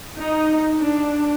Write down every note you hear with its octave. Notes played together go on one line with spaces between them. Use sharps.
D#4
D4